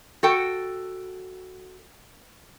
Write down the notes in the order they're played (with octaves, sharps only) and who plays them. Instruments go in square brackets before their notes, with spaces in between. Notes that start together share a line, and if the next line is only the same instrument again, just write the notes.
[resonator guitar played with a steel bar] F#4 A4 G5